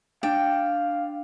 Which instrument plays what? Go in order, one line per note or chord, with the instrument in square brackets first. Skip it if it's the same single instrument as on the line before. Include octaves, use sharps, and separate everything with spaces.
[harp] D4 [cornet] F5 [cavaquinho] G5